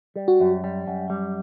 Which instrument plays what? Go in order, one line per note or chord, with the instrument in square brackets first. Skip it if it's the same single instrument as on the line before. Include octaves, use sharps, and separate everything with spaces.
[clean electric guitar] G3
[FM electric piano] F#4
[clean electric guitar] F#2
G3
F#2
G3